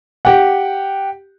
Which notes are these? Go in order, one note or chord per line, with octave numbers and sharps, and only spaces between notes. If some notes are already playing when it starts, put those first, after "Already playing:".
G4 F#5